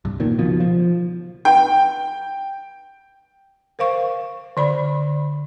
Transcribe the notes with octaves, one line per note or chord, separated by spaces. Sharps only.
C2 G2
A#2 D#3
C#2 B2 F3
F3
G5
A#4 C5 F5 C#6
D3 D5 B5